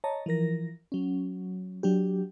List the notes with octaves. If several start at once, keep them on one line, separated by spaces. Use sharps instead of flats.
C#5 D#5 A5 A#5
E3 F3 A#4 A#6
F#3 C#4
F#3 D4 G4